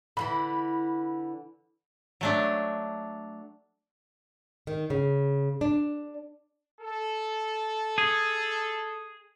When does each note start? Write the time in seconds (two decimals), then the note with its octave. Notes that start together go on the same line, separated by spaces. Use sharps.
0.17 D3 E3 E4 B5
2.21 F#3 A3 D4
4.67 D#3
4.90 C#3
5.61 D4
6.81 A4
7.98 G#4